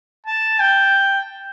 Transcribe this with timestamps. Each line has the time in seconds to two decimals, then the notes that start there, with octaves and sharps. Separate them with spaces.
0.26 A5
0.60 G5